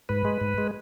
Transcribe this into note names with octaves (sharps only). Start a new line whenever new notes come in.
G#2 B4
G#3
G#2
G#3